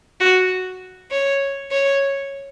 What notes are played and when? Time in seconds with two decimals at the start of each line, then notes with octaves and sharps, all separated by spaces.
0.20 F#4
1.11 C#5
1.71 C#5